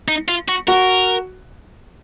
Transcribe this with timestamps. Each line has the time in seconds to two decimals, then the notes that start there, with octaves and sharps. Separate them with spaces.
0.08 D#4
0.28 F4
0.48 F#4
0.67 F#4 A#4